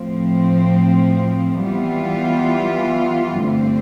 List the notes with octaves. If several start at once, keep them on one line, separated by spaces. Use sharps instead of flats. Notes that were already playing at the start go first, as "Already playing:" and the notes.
Already playing: A2 F3 C4
E3 G3 B3 F4
G2 D3 A3 C4